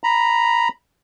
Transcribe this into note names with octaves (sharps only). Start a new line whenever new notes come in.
A#5 B5